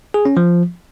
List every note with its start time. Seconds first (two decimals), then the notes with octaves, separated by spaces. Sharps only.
0.14 G#4
0.25 C#4
0.37 F3